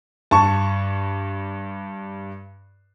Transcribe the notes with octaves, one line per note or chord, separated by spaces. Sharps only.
G2 A5 C#6